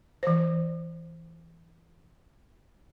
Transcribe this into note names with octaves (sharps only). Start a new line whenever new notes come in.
E3 C5